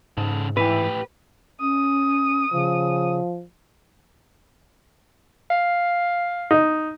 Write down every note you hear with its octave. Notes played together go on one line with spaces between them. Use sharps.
G#2 C#3 A4
A2 E3 G4 B4
C#4 D#6
C#3 F3
F5
D#4